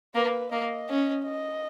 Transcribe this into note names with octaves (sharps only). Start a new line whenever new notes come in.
A#3 B4
A#3 D#5
C#4
D#5